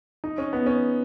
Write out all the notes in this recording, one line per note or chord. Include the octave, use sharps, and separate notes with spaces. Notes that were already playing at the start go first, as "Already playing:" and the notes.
D#4
C#4
B3
C#4